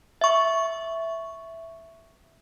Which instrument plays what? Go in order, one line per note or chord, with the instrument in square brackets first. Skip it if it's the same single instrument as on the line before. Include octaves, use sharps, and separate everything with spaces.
[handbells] E5 C#6